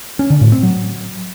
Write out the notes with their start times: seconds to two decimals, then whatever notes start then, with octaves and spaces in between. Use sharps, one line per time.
0.19 C#4
0.30 D3
0.41 A2
0.52 C4
0.63 F#3